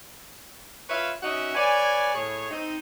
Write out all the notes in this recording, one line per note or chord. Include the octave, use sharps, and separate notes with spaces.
F4 B4 C#5 E5 F5
C#4 D#4 F#4 D#5 E5
B4 C#5 D5 G#5
A2 G#4 C#5
C4 D#4